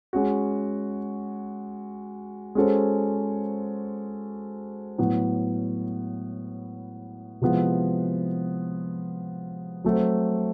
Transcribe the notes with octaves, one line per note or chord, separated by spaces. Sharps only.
G#3 C#4 F#4
G#3 C#4 F#4 A4 C5
A2 F#3 B3
C3 F3 G#3 B3 E4
F#3 A3 C4